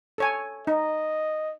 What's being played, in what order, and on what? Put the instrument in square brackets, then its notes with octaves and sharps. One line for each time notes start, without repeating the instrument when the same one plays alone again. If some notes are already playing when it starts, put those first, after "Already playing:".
[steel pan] A4 C#5 G#5
[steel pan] D#4 [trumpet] D#5